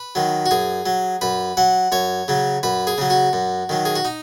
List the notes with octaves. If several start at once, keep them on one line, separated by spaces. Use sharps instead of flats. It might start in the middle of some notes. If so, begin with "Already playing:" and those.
Already playing: B4
D#3 F#3
F#4
F#2 G#4
F#3
F#2 B4
F#3 F#5
F#2 C#5
C#3 F#3
F#2 B4
G#4
C#3 F#3
F#4
F#2
D#3 F#3
G#4
F#4
D#4